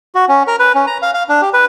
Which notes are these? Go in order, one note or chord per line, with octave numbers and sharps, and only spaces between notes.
F#4
C#4
A#4
B4
C#4
A#5
F5
F5
D4
G4
B4